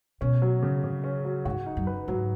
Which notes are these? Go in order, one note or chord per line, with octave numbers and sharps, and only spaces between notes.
B2 C#4
F#3
C#3
C#3
C#4
F#3
G#2 F#4
D#4
F#2
B4
G#2 F#3